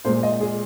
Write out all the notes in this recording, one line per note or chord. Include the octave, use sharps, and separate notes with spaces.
A#2 G#3 C5
D#5
G#4